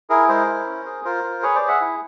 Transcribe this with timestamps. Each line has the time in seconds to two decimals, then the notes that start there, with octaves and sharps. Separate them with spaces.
0.10 E4 G#4 A#4
0.29 G#3 A#4 C5
0.48 E4
0.66 C#4
0.86 G#4
1.05 F4 A#4 C5
1.24 F4
1.43 G#4 B4 C#5
1.55 C5 D5
1.61 G#4
1.68 E5 F#5
1.81 E4